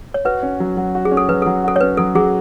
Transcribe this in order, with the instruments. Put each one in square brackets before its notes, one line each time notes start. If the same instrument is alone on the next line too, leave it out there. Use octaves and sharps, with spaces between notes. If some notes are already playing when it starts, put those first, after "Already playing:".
[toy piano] C#5
[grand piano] F#4 [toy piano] B4
[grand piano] C#4
F#3
F#3
F#4
[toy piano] G#4
[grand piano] C#4
[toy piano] A4
[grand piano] F#3 [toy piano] B4
[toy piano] A4
[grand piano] F#3
[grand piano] F#4 [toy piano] A4
[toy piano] C#5
[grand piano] C#4 [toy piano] B4
[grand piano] F#3 [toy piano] A4
[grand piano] F#3 [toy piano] G#4